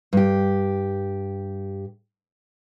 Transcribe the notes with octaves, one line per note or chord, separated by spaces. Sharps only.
G2 G4